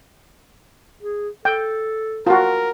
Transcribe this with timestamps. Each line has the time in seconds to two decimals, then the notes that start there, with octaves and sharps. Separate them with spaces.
1.03 G#4
1.45 A4 G5
2.27 F4 F#4 A#4